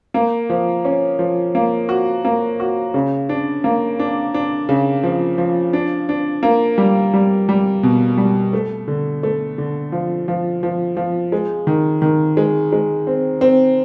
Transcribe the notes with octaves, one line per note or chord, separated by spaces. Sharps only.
A#3
F3
C#4
F3
A#3
F#4
A#3
F#4
C#3
D4
A#3
D4
D4
C#3
F3
F3
D4
D4
A#3
G3
G3
G3
B2
G3
A3
D3
A3
D3
F3
F3
F3
F3
G#3
D#3
D#3
G#3
G#3
C4
C4